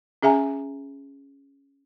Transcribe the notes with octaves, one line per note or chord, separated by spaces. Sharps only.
C#4 G#4 E5 G#5 A#5